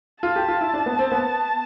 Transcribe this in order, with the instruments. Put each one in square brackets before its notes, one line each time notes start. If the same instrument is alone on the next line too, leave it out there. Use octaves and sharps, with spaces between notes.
[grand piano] F4 [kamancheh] A5
[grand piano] G4
F4
E4
D4
B3
C4
B3